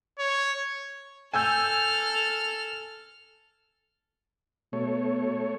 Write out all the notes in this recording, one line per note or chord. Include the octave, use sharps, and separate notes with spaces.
C#5
A4 G#5 E6 F6 G6
B2 A3 C#5